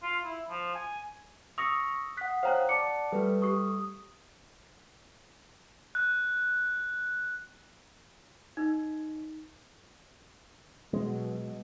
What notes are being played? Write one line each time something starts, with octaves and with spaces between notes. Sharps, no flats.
F4
E4
F3
G#5
C#6 D#6 E6 A#6 C#7 F7
F#5 D#6 F#6 B6
C5 C#5 F5 G5 A#5 F#6
D5 F#5 A5 D6 C#7
G3 A3 A4 B4
G4 C#6 D#6
F#6
D#4
B2 F#3 G#3